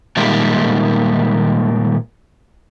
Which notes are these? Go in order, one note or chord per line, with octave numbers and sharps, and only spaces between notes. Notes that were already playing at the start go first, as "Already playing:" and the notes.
A#2 D#3 G3 G#3 A#3